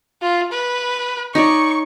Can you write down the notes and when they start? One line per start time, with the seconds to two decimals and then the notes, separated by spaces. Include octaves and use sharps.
0.22 F4
0.52 B4
1.35 D#4 C#5 D5 C#6